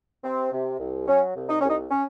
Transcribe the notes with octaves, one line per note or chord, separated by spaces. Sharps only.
C3 C4
C3
C2
F#3 C#4
C2
D#4
C2 C#4
D#4
C#4